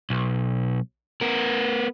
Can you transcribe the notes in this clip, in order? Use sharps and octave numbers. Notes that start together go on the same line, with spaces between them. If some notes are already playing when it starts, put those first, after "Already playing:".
B1
B3 A#4